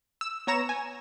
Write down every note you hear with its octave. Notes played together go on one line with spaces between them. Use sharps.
E6
B3 C#5 A#5 E7
G#5